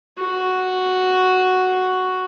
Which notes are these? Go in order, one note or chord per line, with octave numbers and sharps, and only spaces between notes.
F#4